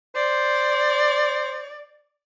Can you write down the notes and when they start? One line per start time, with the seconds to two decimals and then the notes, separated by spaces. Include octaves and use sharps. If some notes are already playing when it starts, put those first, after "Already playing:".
0.16 C5 D5